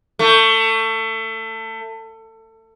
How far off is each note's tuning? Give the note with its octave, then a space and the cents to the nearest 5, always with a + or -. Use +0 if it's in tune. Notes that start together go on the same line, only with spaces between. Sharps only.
A3 +25